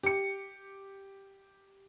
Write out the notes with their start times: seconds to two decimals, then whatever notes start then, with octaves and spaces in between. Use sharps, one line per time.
0.03 G4 C#7